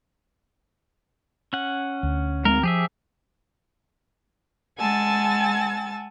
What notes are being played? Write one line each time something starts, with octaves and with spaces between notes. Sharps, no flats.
C#4 F#5
D2
G#3 B3 C4 A#4
F3 G4 G#4 E5
G#3 F#5 G#5 A5 E6 A6